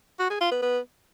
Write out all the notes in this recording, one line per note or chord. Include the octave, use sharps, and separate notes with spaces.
F#4
G#4
F4
B3
B3